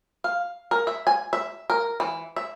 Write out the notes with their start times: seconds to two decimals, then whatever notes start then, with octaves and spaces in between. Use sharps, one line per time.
0.24 F5
0.71 A#4
0.87 E5
1.07 G#5
1.33 E5
1.70 A#4
2.00 E3
2.36 E5